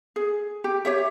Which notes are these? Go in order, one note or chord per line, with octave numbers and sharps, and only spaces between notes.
G#4
G4
G4 C#5 E5